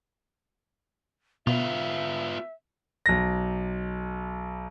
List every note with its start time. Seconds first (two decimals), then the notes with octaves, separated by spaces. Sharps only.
1.47 B2 B3 F4 E5
3.06 B1 A#6